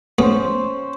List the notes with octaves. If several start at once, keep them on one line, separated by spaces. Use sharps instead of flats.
A3 B3 C#4 G#4 C5